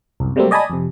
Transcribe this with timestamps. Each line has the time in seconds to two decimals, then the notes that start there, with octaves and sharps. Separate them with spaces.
0.20 C2 F#2
0.36 C3 F#3 G3 A3 A#3 C4
0.51 D5 D#5 G#5 A5 B5 D#6
0.70 F2 C3